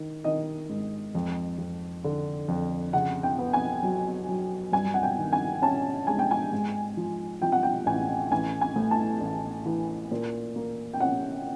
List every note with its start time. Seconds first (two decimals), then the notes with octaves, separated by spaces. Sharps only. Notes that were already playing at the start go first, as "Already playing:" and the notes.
Already playing: D#3
0.24 D#3 D#5
0.69 G#2
1.15 F2
1.58 F2
2.04 D3
2.48 F2
2.93 C#3 F#5
3.23 G5
3.38 B3
3.53 G#5
3.83 F#3
4.29 F#3
4.72 G2 G#5
4.94 F#5
5.03 G5
5.18 D#3
5.33 G#5
5.62 C#4 A5
6.07 G#3 G#5
6.19 G5
6.31 G#5
6.52 G#2
6.97 F3
7.42 F3 G5
7.52 F#5
7.63 G5
7.86 A1 G#5
8.31 A1 G#5
8.61 G#5
8.76 A2
8.91 A5
9.21 A1
9.66 E3
10.11 A#2
10.56 A#3
10.94 G5
11.00 C#4 F#5